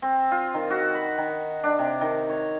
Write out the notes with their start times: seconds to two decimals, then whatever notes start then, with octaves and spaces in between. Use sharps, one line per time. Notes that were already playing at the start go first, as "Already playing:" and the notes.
0.02 C4
0.31 F4
0.54 D#3
0.70 F#4
0.95 B5
1.18 D#3
1.64 D4
1.79 C3
2.01 D#3
2.30 C#5